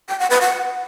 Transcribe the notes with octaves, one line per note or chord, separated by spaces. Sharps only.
G5
F#5
B4
F#5